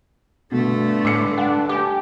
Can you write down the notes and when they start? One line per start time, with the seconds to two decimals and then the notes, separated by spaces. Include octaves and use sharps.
0.52 G2 B2 D3 A3
1.05 A2 D6 E6 C#7
1.38 D4 F#5
1.69 G4 G#5 A5 D6